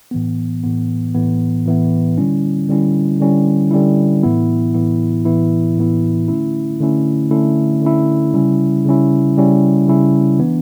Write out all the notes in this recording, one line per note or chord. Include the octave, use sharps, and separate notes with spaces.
A2 E3 B3
A2 E3 B3
A2 E3 B3
A2 E3 B3
D3 G3 C#4 E4
D3 G3 C#4 E4
D3 G3 C#4 E4
D3 G3 C#4 E4
A2 E3 B3 E4
A2 E3 B3 E4
A2 E3 B3 E4
A2 E3 B3 E4
D3 A3 C#4 E4
D3 A3 C#4 E4
D3 A3 C#4 E4
D3 A3 C#4 E4
C#3 G3 C#4 E4
C#3 G3 C#4 E4
C#3 G3 C#4 E4
C#3 G3 C#4 E4
E3 B3 D4